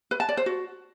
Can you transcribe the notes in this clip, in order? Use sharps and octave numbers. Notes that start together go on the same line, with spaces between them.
B4
A5
D5
C5
F#4